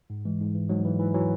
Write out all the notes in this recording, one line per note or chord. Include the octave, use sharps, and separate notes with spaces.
G#2
E3 G#3
G#2
E3
G#2 F#3
E3
G#2 E3
E3 F#3